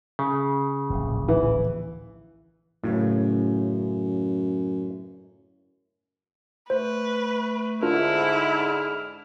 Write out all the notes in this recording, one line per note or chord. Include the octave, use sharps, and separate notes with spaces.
C#3
D1 A#1
E3
F#2 A2 C#3
A3 B4 C5
G#2 D3 D4 E4 F4 A#4 F6